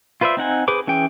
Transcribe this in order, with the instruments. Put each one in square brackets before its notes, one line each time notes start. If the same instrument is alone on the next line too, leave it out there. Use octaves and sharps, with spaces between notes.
[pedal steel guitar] F4 B4 C5 D5 E5
C4 D#4 F#5 G#5
G#4 B4 C5 D6
E3 C#4 G#4 G5